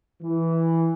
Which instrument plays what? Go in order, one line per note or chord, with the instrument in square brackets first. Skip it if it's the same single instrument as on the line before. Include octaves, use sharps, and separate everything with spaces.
[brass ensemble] E3